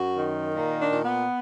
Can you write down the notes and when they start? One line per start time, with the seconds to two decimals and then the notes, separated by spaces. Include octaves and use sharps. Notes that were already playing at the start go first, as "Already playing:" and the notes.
Already playing: F#2 F#4
0.18 D#3
0.55 A#2
0.80 D4
0.92 A#2
1.05 B3